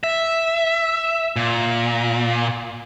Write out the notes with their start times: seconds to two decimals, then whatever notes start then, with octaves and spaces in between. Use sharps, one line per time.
0.04 E5
1.36 A#2